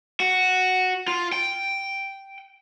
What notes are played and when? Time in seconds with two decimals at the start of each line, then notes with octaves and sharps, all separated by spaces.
0.20 F#4
1.08 F4
1.33 G5